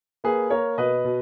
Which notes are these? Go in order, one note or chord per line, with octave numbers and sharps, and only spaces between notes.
A#3 G#4 B4
A#3 A#4 C#5
B2 B4 D#5
B2